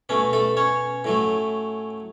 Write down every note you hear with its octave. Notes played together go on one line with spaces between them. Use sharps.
B2 A3 C#4
A3 A4
C#4 C#5
A2 F#3 A3